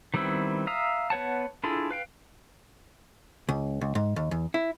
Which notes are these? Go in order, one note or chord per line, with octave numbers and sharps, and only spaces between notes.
D#3 G3 B3 C4 E4
E5 F5 A#5 D#6
B3 B4 C#5 F#5 A5
D4 E4 F4 G#4 A4
B4 F5 G5
C#2
C#2
G#2
D#2
E2
E4